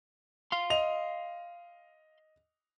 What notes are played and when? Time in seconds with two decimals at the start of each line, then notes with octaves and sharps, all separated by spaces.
0.52 F5 C6
0.70 D#5 F7